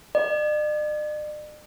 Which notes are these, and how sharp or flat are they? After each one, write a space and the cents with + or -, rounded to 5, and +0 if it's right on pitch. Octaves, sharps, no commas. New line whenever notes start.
D5 +45